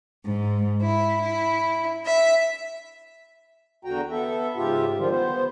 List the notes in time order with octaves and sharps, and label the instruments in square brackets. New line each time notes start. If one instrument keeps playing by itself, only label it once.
[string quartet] G#2
E4
E4
E5
[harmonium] E2 D3 F#4 G5 A#5
B3 A4 E5
G#2 C#3 F4 G4 E5
D3 D#3 F3 G3 F4
B3 C5